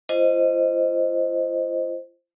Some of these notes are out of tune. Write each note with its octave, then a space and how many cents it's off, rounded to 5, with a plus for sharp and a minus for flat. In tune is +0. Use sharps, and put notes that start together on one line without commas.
F4 -35 C5 +0 D#5 +0